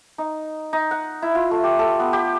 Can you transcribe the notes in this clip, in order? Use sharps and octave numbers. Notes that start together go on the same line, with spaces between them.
D#4
D#4
F#5
E4
F4
A3
G4
A4
B3
G4